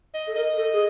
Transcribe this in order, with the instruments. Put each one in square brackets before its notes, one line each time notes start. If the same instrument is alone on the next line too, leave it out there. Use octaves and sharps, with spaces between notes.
[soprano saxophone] D#5
[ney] A4
[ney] A#4 [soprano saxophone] D#5
[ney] A4
G#4